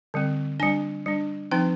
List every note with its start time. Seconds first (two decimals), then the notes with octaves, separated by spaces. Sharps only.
0.14 D3 G3 C4
0.60 G3 D4 G#5
1.06 G3 D4
1.51 F3 C4 D#4 G5